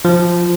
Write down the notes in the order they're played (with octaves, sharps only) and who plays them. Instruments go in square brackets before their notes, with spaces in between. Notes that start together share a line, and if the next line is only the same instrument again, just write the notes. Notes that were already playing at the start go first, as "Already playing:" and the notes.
[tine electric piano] F3